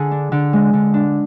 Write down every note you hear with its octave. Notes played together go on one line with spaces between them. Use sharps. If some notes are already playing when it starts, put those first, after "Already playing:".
Already playing: D3 G#4
D4
D3
G#3
D3
D4